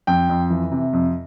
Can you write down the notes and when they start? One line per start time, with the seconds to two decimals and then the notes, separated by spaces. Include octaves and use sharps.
0.07 F2 G5
0.29 F2
0.50 E3
0.71 C3
0.93 F2